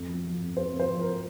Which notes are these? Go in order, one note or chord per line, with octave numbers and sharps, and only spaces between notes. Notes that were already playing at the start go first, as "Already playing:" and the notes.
Already playing: F2
F3
F3
F2
F2 C5
F3
C5
F3
A#4